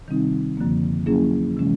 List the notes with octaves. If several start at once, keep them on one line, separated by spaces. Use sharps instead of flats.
C3 D#3 G3 C4 D#4
F#2 D3 F3 A#3
F#3 A#3 C#4 E4 G#4
C3 E3 G#3 C#4